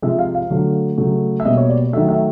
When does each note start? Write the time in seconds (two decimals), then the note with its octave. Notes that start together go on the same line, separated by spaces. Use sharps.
0.02 C3 F3 G#3 E5
0.19 F5
0.35 F5
0.50 D3 F#3 A3
0.98 C#3 F#3 A3
1.40 E5
1.45 B2 G3 A#3 D#5
1.57 C#5
1.69 D5
1.93 D#3 F#3 A3 E5
2.09 E5